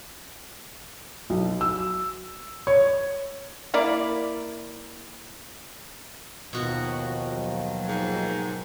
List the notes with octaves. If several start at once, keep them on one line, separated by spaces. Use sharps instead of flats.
B1
E6
C#5
A#3 E4 D5
D#2 B2 D#3 F3 F#4
F#3
G#2